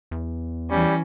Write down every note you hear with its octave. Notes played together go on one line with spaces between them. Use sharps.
E2
E3 G3 C#4